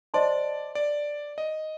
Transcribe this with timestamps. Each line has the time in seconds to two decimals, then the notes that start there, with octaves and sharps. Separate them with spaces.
0.14 C5 D5 D#5 A5 C6
0.75 D5
1.38 D#5